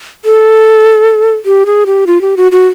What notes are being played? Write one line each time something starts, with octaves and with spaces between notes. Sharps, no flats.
A4
G4
G#4
G4
F4
G4
F#4
F#4